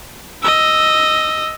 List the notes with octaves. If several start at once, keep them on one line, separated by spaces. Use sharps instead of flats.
D#5 E6